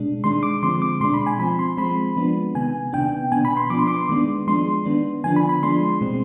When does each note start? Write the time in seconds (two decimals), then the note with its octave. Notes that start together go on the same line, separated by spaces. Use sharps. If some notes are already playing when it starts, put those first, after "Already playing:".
Already playing: B2 G#3 D4
0.24 D#3 G#3 D4 C6
0.43 D6
0.62 D3 F3 G#3 C4 C6
0.82 D6
1.00 B2 G#3 D4 C6
1.14 B5
1.27 G#5
1.39 F3 C4 B5
1.59 C6
1.77 F3 G#3 C4 B5
2.16 F3 G#3 B3 D4
2.55 C3 D#3 B3 G#5
2.93 C3 D#3 B3 D4 G5
3.32 B2 B3 D4 G#5
3.45 B5
3.57 C6
3.70 F3 B3 D4 D6
3.79 C6
3.87 D6
4.09 D#3 G#3 B3 D4
4.47 F3 G#3 D4 C6
4.85 D#3 B3 D4
5.24 D3 F3 B3 D4 G#5
5.36 B5
5.49 B5
5.63 F3 G#3 D4 C6
6.01 B2 G#3 C4